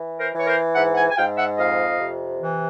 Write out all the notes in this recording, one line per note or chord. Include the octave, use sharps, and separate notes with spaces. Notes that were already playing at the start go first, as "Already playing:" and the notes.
Already playing: E3
A#4 C5
E3 C#5
A#4 C5
G#2 E5 F#5
F#5 G#5
G#5
G#2 F5 G5
E5 F#5
F2 D#5 F5
C3
E3